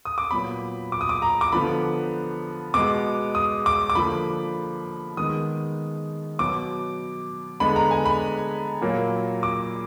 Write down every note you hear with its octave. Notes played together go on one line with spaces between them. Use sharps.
D#6
D6
A#2 F#3 B3 B5
D6
D#6
D6
A#5
D6
D3 F3 B3 B5
B2 G#3 B3 D6
D#6
D6
D6
D3 F3 A#3 B5
D#3 G#3 B3 D#6
B2 F#3 B3 D6
D3 G#3 B3 B5
A#5
G#5
B5
A#2 F#3 A#3
D6